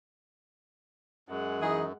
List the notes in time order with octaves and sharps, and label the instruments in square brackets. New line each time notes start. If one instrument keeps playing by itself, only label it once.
[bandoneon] F#2 [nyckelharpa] G#3 F#5
[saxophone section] E3 D#4 G#4